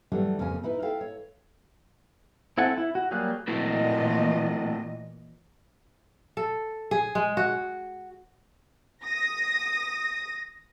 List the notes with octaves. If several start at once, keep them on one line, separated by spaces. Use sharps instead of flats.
E3 F#3 G3 A3 D4
F2 C#3 A#3 G#5
D#4 E4 B4
E4 A4 F5 G5
C#5
C4 E4 A4 F#5 G#5
E4
F#4
F#3 G3 A#3 G#4 F#6
A#2 E3 A3 E4 F#4 D#5
A4
G#4
G#3
F#4
D#6 A#6